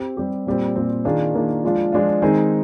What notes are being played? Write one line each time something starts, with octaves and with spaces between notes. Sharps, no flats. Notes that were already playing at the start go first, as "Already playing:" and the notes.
Already playing: C4 G4
G3 C4 G4
A#2 G3 C4
A#2 G3 C4
D#3 A#3 D4 F4 G#4
D#3 A#3 D4 F4 G#4
F3 G#3 D4 F4
F3 G#3 D4 F4
D#3 G#3 C4 D#4 G#4